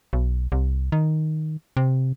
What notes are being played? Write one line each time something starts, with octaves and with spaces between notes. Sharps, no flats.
B1
C2
D#3
C3